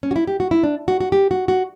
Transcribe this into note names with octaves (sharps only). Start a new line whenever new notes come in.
C#4
F#4
E4
G4
F#4
E4
D4
F#4
F#4
G4
F#4
F#4